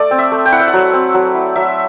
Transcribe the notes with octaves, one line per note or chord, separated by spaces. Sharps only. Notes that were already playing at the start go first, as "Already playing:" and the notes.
Already playing: A3 D5
C4
E5
A3
G5
E4 F#5
E5
F#5
F#3
C4
F#3
E4
F#3 E5